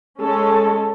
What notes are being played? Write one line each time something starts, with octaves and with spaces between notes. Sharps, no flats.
G#3 C#4 A4